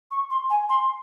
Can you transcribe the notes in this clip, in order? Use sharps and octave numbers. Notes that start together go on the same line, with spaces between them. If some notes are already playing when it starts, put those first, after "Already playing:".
C#6
C6
G#5
C6